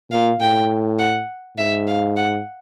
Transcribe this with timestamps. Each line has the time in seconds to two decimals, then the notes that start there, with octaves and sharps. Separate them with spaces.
0.11 A#2 F5
0.40 A2 G5
0.99 F#5
1.57 G#2 E5
1.87 F5
2.16 F#5